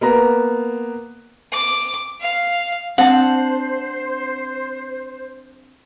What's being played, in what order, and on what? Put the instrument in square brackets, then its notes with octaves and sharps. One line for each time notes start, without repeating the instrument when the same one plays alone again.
[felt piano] A#3 B3 A#5
[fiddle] D6
F5
[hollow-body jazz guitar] C4 D4 [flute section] C5 [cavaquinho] F#5 A5